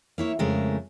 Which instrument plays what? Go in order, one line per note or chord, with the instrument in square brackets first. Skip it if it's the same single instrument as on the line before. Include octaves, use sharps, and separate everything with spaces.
[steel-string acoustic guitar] A#3 E4 C#5
F2 C#3 G#3 A3 A#4